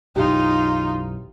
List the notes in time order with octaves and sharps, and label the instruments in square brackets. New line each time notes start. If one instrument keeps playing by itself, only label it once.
[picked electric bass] B1 F#2 E3 [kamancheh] D#4 F4 [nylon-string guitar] G4